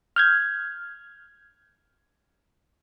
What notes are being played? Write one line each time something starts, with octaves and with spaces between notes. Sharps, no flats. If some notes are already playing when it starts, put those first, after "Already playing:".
F6 G6 G#6